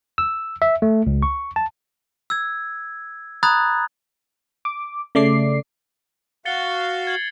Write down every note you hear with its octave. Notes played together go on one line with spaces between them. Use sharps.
E6
E5
A3
C#2
C#6
A5
E6 G#6
A#5 B5 D#6 F#6 G#6 A6
D6
C#3 A3 D5 D6 C7
F#4 F5 A6 C#7 G7
G#6 C7 F#7